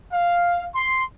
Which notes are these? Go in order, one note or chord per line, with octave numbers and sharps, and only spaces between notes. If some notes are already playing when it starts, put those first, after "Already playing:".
F5
C6